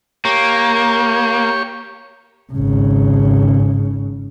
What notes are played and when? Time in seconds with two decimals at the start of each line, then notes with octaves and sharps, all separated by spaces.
0.25 A#3 G4 C#5 C#6
2.53 G#1 C#3